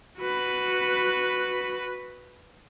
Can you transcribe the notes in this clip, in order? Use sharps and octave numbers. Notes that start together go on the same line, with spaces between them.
F#4 B4